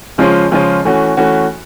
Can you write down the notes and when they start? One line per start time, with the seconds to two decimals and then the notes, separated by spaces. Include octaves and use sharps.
0.18 C#3 F3 G#3 C#4 F4
0.51 C#3 F3 G#3 C#4 F4
0.85 E3 A3 C#4 F#4
1.17 E3 A3 C#4 F#4